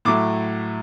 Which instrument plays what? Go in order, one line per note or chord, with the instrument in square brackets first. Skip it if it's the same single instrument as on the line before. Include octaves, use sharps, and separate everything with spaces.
[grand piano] A2 F#3 A3 D6